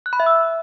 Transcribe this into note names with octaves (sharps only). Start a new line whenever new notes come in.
F#6
B5
E5
E6